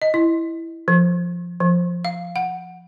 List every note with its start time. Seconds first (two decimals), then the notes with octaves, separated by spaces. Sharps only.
0.02 D#5
0.14 E4
0.88 F3
1.60 F3
2.05 F5
2.36 F#5